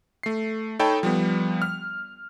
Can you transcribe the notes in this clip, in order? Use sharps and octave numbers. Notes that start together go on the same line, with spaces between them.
A3 C7
D#4 A4 C#5 G5 A5 B5
F3 G3 B3
F6